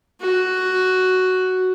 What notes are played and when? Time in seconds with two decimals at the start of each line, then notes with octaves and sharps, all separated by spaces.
0.21 F#4